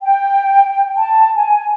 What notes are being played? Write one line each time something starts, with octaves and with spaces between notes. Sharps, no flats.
G5
A5
G#5